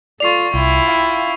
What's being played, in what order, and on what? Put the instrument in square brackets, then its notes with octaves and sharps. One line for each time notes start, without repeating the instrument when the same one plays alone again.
[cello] F4 A4 [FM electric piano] D5 [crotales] C#6 C7 F7
[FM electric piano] C2 [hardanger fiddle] E4 [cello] F4 G5
[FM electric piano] F5